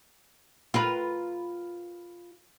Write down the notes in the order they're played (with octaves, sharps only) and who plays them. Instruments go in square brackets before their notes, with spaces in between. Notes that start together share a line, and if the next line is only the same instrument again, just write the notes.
[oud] F4 A#4 B4